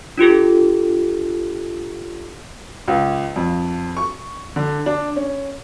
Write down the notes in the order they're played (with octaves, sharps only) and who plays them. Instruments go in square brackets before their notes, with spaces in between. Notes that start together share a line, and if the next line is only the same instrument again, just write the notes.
[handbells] D4 F4 G4 A4
[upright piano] C#2
F2
C#6
D3
D4
C#4